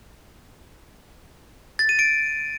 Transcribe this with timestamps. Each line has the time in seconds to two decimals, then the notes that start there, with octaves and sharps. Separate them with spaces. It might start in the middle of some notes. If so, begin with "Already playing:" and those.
1.79 A6
1.89 D#7
1.99 D7